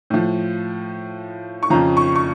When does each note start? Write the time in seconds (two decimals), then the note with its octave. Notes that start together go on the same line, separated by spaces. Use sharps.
0.10 A2 F3
1.63 C#6
1.70 F2 C#3 F3 A#5
1.97 C#6
2.16 C#6